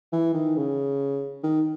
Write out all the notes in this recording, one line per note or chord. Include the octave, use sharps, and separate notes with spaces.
E3
D#3
C#3
D#3